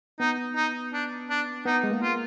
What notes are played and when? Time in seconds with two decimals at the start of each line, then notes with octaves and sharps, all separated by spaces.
0.20 B3 D#4
0.56 D#4
0.93 D4
1.30 D4
1.66 B3 D#4
1.83 G#3
1.91 A#3
2.02 F4